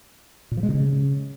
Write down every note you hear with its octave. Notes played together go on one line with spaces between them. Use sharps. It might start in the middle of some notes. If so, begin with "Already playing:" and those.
A#2
F3
G#3
C3
C#3